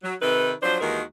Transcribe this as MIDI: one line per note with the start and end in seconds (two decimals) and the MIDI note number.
0.03 0.15 54
0.22 0.53 48
0.22 0.53 51
0.22 0.53 63
0.22 0.53 69
0.22 0.53 71
0.62 0.77 53
0.62 0.77 54
0.62 0.77 62
0.62 0.77 72
0.81 1.01 39
0.81 1.01 51
0.81 1.01 52
0.81 1.01 56
0.81 1.01 66
0.81 1.01 70